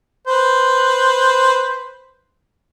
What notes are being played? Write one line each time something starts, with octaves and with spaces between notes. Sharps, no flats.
B4 C5